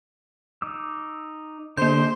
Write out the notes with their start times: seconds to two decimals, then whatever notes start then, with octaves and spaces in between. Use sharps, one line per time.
0.62 D#4 D6 E6
1.77 D3 A#3 C5 G6